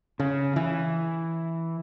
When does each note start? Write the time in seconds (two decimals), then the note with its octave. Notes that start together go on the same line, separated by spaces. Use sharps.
0.20 C#3
0.56 E3